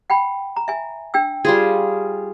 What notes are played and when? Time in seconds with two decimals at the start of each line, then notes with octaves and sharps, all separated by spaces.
0.10 F#5 G5 B5
0.56 A#5
0.68 E5 G#5
1.14 D4 G5 E6
1.45 G3 F4 G#4